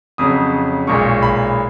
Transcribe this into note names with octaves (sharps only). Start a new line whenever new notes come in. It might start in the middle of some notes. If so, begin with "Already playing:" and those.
F2 C#3 F#3 D#6
B1 A#2 G#3 C#6
B5